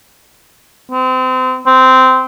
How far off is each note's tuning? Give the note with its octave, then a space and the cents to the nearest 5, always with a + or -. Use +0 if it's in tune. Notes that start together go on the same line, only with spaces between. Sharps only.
C4 -30
C4 -15